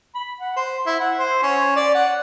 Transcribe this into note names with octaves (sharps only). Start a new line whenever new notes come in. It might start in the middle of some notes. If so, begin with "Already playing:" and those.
B5
F#5
C5
E4
F#5
C5
C#4
D5
F#5